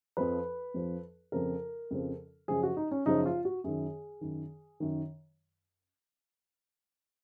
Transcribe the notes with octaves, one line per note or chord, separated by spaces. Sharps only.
F2 F3 B4
F2 F3
F2 C#3 F3 A#4
F2 C#3 F3
F#2 C#3 F3 G#4
F#4
D#4
C#4
F#2 C#3 F3 D#4
F4
F#4
F#2 D#3 G#4
F#2 D#3
F#2 D#3